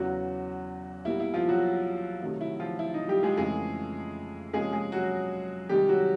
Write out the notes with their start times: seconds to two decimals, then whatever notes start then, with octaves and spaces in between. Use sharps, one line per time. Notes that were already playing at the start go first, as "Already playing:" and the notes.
Already playing: E2 C#3 E3 F#3 F#4
1.05 B2 G3 A#3 E4
1.20 E4
1.34 F3 F4
1.48 F#3 F#4
2.21 C3 D#3 F#3 A3
2.41 E4
2.60 F3 F4
2.79 E4
2.94 D#4
3.08 G3 G4
3.23 G#3 G#4
3.37 F2 C#3 E3 G#3 A3 G#4
4.53 C3 F3 G#3 A#3 C#4 G#4
4.73 G#3 G#4
4.92 F#3 F#4
5.69 C3 D#3 G3 G#3 G4
5.89 F#3 F#4